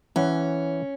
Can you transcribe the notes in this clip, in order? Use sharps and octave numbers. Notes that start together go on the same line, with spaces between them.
E3 C#4 F#5